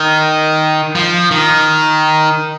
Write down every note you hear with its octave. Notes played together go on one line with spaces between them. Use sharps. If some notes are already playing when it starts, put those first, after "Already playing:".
Already playing: D#3
F3
D#3